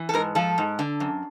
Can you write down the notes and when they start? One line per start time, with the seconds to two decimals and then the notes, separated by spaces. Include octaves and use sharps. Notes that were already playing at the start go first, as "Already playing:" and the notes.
Already playing: E3
0.09 A4
0.14 G#2 A#4
0.35 F3 A4
0.58 G#2
0.79 D3
1.00 F#2